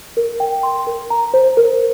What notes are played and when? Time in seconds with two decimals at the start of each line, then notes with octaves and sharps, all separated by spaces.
0.17 A#4
0.40 G5
0.63 C6
0.87 A#4
1.10 A#5
1.34 C5
1.57 A#4